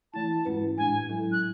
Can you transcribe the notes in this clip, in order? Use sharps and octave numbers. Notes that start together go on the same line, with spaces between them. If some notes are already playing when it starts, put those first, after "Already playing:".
E3 A3 E4 A5
G#2 G#3 C#4 E4 B4
A2 G#3 D4 G#5
F#3 C#4 E4 A4
F#6